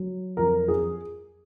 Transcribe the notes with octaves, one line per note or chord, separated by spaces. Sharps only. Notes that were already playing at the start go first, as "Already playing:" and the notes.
Already playing: F#3
F2 A#4
G#4